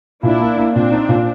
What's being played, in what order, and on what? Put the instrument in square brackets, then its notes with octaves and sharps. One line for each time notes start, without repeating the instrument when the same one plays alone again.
[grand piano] A#2 [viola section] D4 E4
[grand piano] A#3
A#3
[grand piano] A#2 [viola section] C4 D4
[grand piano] D#4
A#2